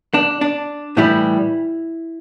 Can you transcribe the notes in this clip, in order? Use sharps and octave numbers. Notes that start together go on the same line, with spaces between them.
D4
D4
A2 E3 G3 E4